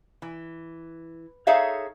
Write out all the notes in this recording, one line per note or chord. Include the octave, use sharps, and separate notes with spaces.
E3
D#4 G#4 A4 C#5 E5 F5